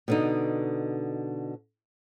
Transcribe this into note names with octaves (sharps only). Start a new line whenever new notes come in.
B2 D3 D#4